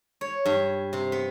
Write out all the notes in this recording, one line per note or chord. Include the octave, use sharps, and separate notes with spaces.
C#5
G2
C3
B3